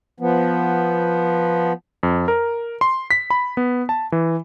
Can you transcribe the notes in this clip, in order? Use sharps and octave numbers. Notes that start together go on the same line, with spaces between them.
F3 B3
F2
A#4
C6
B6
B5
B3
A5
E3